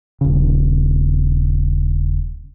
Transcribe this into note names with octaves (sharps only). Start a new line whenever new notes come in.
D#1 C#3